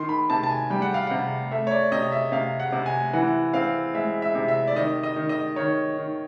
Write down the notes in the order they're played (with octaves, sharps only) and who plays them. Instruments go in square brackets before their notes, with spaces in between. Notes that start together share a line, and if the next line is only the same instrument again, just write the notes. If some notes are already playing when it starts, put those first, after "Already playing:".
Already playing: [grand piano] D#3 C6
B5
C3 A5
A5
G#5
G3 G5
F#5
F5
C3 F#5
A3 E5
C#5
D5
C3 D#5
E5
C3 F5
F#5
C3
G#5
E3 F#5
C4 F5
G#3 E5
E5
C3
E5
D5
D#3 D#5
D#5
D#3
D#5
D#3 C#5
D#3